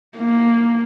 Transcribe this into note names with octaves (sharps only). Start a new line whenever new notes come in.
A#3